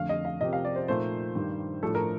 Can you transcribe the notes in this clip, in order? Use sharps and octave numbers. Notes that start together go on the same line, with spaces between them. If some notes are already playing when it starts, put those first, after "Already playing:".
Already playing: F2 D3 A3 F5
D#5
F5
C3 F3 C4 G4 A#4 D#5
F5
D5
C5
A#2 F3 A3 D#4 C5
G2 D#3 G3
A2 F3 A3 D4 A4
A#4